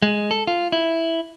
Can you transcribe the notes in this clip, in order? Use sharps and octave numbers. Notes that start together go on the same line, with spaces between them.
G#3
A4
F4
E4